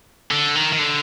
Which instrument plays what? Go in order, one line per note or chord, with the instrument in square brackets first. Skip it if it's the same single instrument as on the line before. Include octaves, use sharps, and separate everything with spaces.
[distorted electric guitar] D3
D#3
D#3
D3